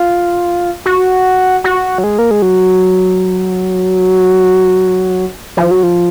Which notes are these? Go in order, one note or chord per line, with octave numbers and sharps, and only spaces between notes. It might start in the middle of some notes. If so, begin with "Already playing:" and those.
Already playing: F4
F#4
F#4
F#3
G#3
A#3
G#3
F#3
F3
F#3
F3